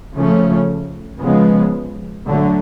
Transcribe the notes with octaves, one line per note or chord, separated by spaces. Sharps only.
C#3 F3 A3 C#4
C#3 F3 G#3 B3
D3 F#3 A3